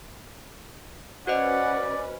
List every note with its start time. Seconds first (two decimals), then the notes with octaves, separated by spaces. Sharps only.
1.27 C#4 F#4 B4 C5 D5 D#5 F#5